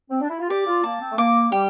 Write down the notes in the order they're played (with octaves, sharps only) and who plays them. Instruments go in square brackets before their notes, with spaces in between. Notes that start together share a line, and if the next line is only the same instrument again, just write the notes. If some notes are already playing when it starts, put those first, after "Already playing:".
[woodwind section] C4
D4
E4
F4
[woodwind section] G4 [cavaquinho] D5
[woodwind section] F4
[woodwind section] A#3 [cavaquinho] A5
[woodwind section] C4
A3
[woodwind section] A#3 [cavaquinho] D6
[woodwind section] G3 [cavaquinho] G4